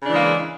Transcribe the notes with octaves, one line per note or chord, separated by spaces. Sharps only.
C#3 E3 G#3 A#3 D4